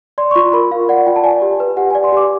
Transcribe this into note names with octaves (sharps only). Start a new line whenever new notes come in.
D5 C6
C#6
F4 C6
A#4 B5
F4 F5
D5 F#5
F4 G5
A5
D5 G#5
G4
B4
G4 F#5
D5 G#5
C6
G4 D6